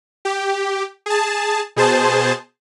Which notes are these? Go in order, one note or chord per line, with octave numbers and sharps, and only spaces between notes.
G4
G#4 A5
B2 G#4 C5 A5